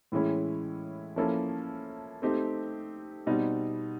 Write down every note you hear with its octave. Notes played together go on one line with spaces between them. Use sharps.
A2 E3 G#3 C#4 E4
F3 A#3 C#4 E4 A4
A3 C4 D#4 G4
B2 G3 C4 D#4